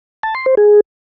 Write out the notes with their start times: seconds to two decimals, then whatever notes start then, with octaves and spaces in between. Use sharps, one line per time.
0.23 A5
0.35 C6
0.46 C5
0.57 G#4